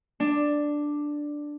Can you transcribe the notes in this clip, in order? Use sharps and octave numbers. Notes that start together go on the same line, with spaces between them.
D4